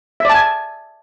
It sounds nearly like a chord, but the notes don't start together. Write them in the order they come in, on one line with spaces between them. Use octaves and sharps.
E5 D5 A5 G#5